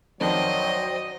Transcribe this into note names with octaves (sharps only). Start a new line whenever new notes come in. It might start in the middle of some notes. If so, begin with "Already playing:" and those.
F2 D#3 F#3 C4 C5 D5 D#5 G5